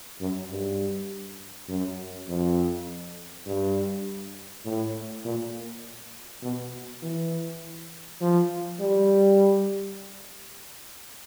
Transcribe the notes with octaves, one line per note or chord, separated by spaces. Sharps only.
F#2
G2
F#2
F2
G2
A2
A#2
B2
E3
F3
G3